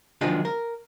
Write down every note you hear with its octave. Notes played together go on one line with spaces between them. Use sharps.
D#3 F3 F#3 G#3 D4 F4
A#4